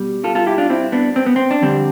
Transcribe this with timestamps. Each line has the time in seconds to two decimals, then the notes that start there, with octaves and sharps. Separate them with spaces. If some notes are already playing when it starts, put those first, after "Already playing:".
Already playing: B2 G3
0.24 F4 A4
0.35 F4 A4
0.46 E4 G4
0.58 D4 F4
0.70 C4 E4
0.92 B3 D4
1.16 C4
1.26 B3
1.36 C4
1.51 D4
1.62 F2 D3 G3 C4